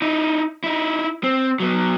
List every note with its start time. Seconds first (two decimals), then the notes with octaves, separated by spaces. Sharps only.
0.02 D#4 E4
0.64 D#4 E4
1.24 C4
1.60 F#3 B3